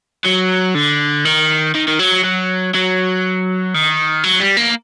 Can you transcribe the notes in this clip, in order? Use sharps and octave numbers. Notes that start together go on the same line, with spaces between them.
F#3
D3
D#3
D#3
D#3
F#3
F#3
F#3
D#3
F#3
G3
A#3